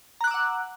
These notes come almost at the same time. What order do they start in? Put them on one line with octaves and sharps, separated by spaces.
A#5 F#6 D6 E6 F#5